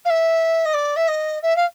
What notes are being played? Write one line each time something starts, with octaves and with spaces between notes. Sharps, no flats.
F5
E5
D#5
D5
E5
D#5
E5
F5